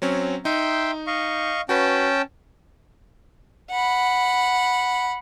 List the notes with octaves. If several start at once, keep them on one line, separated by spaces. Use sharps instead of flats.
F#3 C4 C#4
D#4 E5 G5 C6
D#5 F5 C#6
C#4 F#4 B4 G5 A5
F#5 B5